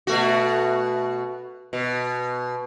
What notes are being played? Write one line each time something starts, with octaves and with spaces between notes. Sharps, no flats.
B2 A3 F#4
B2